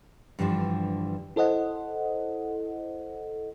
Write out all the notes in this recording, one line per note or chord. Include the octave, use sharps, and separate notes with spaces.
G2 D3 E3 F3 G3
E4 A4 C5 D#5 F#5